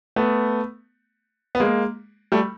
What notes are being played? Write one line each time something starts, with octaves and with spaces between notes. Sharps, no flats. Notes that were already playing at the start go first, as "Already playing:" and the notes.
A3 B3
B3
G#3 A#3
G3 A3